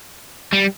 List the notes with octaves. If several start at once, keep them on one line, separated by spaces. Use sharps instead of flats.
G3